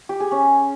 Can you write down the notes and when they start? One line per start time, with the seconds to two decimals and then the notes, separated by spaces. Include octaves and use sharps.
0.09 G4
0.20 G#4
0.31 C#4